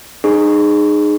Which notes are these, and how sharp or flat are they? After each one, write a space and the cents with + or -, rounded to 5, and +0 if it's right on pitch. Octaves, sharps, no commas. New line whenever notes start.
D#4 -30 G#4 +0 C#6 +0